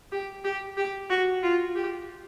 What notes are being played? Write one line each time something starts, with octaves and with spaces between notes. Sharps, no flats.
G4
G4
G4
F#4
F4
G4